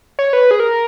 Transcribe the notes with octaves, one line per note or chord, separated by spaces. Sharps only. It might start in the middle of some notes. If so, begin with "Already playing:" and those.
C#5
B4
G#4
A#4